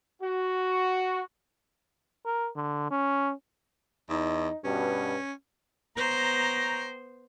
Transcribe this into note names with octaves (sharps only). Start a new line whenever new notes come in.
F#4
A#4
D3
C#4
E2 D#4
G2 B2 C#4
B3 C5 C#5 G5 A#5